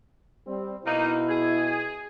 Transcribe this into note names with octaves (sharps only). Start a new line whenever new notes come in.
G3 C4
B2 A#3 D#4 E4
G#4